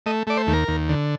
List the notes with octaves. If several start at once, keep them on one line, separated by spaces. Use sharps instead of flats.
A3 D#5
A3 D5
C5
D#2
A#4
D#2
D3